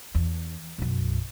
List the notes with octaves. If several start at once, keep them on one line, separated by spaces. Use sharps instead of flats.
E2
B1 F#2